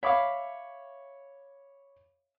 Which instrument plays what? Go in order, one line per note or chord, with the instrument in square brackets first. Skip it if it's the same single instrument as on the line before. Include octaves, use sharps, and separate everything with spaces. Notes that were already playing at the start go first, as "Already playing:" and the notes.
[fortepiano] C#5 B5 D6 [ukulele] E5 F5